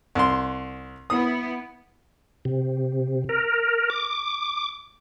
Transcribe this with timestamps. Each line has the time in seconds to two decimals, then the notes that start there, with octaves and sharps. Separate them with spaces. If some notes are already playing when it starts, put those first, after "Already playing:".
0.15 C2 C6
1.10 B3 E4 D#6
2.45 C3
3.29 A#4
3.90 D6